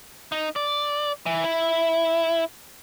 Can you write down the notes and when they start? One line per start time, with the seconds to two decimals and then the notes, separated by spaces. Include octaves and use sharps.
0.32 D#4
0.56 D5
1.26 E3
1.44 E4